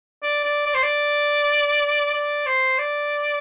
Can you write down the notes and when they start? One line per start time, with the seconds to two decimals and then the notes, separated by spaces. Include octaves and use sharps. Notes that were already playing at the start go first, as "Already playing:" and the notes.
0.23 D5
0.44 D5
0.66 D5
0.74 C5
0.83 D5
2.14 D5
2.46 C5
2.79 D5